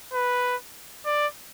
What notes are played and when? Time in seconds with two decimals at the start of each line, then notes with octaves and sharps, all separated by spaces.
0.13 B4
1.05 D5